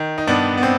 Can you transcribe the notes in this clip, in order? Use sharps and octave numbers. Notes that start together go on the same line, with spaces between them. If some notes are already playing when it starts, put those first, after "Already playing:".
Already playing: D#3
D#4
G2 B3 D4
B3
C4